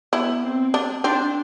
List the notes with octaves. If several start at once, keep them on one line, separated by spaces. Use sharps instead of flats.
B3 E4
C4
D4
C4 D4